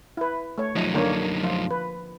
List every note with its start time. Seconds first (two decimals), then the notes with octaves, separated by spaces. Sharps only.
0.17 E4 B4
0.58 A3 C#5
0.76 F#2 F3 D#4
0.94 D3 A#3 C#5
1.43 F3 F4
1.71 B4